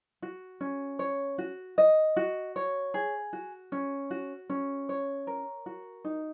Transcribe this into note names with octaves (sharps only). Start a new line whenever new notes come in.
F#4
C#4
C#5
F#4
D#5
F#4
C#5
G#4
F#4
C#4
F#4
C#4
C#5
A#4
F#4
D#4